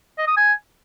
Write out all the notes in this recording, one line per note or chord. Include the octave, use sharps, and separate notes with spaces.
D#5
D#6
G#5